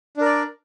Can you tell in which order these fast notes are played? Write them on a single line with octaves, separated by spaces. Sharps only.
D4 A#4 D5